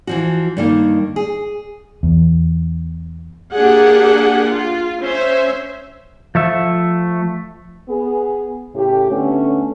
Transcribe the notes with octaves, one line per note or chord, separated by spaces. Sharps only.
E3 F3 F#4
G2 D#3 A#3
G#4
E2
A#3 D4 G4 G#4 F#5
F4
C#4 C5 E5
F3 A3 E5
B3 G#4
A2 C#3 G4
D3 A3 B3 C#4